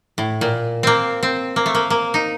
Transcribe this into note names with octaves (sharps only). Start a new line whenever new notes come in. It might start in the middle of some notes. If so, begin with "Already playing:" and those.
A2
A#2
A#3 C4
C4
A#3
A3
A#3
A#3
D#4